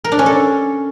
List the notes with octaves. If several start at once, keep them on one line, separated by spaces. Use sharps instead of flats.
A#4
D4
C#4
A4